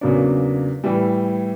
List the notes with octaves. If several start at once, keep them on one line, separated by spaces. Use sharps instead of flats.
E2 C#3 F#3 A#3 D4
A2 E3 G3